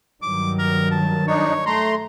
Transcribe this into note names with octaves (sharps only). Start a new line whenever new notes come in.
G2 D#3 F#3 D6
A#4
A5
D4 D#4 C#5
A3 A#5 C6